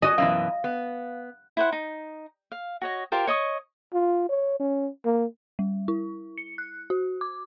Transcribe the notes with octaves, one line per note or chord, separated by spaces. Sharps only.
F#4 D#5 G#5
F#2 B2 E3 F5
B3
E4 C5 F#5
D#4
F5
F#4 C#5 D#5
F4 G4 A#4 C5
C#5 D#5 C#6 D#6
F4
C#5
C#4
A#3
G3
E4
C#7
F#6
F#4
D6